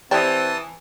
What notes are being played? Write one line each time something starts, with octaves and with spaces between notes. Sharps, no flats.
E3 C4 G4 D5 A5 D#6